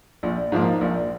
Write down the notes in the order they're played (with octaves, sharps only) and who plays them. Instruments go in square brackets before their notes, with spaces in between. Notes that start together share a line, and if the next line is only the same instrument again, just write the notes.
[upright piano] A#1
G#2 F3 A#3
A#1